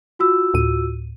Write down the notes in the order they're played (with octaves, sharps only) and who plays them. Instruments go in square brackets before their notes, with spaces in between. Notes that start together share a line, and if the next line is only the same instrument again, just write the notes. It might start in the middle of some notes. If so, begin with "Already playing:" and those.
[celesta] F4 F#4 E6
[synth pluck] D2 A2 D#7